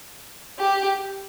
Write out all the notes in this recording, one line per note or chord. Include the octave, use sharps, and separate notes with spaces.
G4